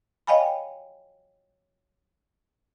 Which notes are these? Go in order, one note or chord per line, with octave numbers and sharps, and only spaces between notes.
C#5 D#5 F5 G5 G#5 B5